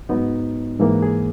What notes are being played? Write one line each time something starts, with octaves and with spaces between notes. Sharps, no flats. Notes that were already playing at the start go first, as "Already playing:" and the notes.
G#2 F#3 B3 D#4
G#2 E3 A#3
G#4